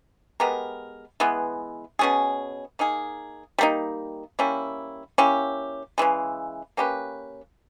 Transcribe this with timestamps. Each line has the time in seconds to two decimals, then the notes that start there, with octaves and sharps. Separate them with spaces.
0.40 G#3 B3 G4 A#4
1.20 E3 G#3 B3
1.99 B2 G3 C#4 G#4
2.79 A#3 D#4 G#4
3.58 G3 A#3 D#4
4.39 G3 A#3 C#4 E4
5.18 A#3 C#4 E4 G4
5.98 C#3 E3 G#3
6.77 A#3 C#4 G4 B4